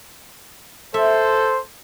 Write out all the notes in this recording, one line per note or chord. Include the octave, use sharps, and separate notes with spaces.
A4 C5 E5